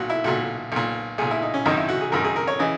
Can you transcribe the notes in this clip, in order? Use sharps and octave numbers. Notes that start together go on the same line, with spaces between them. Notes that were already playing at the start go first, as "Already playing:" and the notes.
Already playing: B1 A#2 F#4
E4
B1 A#2 F#4
B1 A#2
B1 A#2 G#4
E4
D#4
C#4
G#1 F#2 D#3 D#4
E4
F#4
G#4
G#1 F#2 D#3 A#4
G#4
A#4
C#5
C#3 E3 D#5